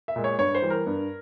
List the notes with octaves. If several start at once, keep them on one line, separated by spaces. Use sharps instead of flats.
E5
A#2 G#3
C#5
G2 C#5
C5
E3 G3
A#4
G2